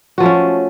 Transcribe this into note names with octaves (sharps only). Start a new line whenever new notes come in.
F3 A3 C#4 F#4